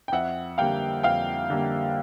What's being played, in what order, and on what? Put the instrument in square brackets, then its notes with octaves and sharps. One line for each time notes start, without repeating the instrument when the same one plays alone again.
[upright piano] G5
F2 E5 F#5
D3 G3 A#3 F5 G5
F2 F5 G5
D3 G3 A#3